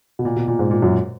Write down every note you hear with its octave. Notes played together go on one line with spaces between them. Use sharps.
B2
A#2
B2
A#2
G#2
A#2
F#2